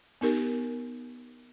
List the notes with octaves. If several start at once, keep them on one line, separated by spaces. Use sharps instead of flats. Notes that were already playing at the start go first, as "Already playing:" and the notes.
B3 D#4 G4 A#4